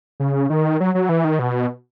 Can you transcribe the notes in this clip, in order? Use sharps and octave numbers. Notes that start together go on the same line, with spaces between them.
C#3
D#3
F#3
F#3
E3
D#3
B2